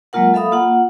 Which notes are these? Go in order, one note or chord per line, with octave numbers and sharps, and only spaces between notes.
F#3 G#3 A#3 F4 A#4 F#5
A4 E5 F5 B5 D#6
A#3 F4 F#5